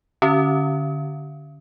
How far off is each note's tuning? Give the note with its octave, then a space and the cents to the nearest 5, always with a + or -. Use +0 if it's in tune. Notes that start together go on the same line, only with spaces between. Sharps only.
D3 +0 C#4 +0